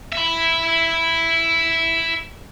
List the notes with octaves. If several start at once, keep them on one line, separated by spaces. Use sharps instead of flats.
E5 B5